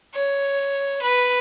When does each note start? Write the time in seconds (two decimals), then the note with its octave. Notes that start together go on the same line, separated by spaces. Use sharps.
0.15 C#5
1.02 B4